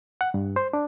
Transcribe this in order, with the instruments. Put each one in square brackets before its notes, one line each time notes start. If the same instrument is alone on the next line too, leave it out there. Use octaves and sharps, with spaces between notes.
[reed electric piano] F#5
G2
C5
D4